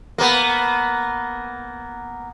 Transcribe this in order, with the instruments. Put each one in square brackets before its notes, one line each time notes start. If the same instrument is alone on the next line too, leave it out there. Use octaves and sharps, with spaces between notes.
[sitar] A#3 B3